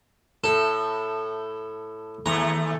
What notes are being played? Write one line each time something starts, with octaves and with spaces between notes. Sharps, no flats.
A2 A4
D#2 A3 A#5